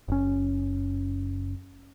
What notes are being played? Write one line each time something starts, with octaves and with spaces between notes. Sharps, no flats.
F#1 C#4